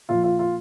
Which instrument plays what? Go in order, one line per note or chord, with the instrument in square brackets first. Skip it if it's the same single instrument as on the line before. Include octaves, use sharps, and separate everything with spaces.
[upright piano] A#2 F3 F4
F4
F4